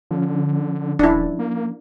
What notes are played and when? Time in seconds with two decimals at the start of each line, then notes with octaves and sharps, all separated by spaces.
0.11 D3 F3 C#4
0.99 D#1 D4 E4
1.39 A#3